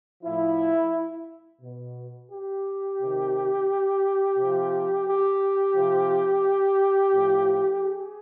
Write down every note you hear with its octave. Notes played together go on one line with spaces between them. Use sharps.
A2 F3 E4
B2
G4
C3 D#3
C3 F3
G4
C3 F3
A2 F3
G#4